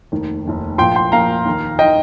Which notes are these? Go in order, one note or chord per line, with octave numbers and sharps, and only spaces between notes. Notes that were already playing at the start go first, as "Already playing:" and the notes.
F1 D#2 D#3
F1 D#2 D#3
A#1 A#2 F3 G5 C6
G5 C6
A#1 A#2 F3 F5 A#5
D#2 D#3
D#3 D#5 G5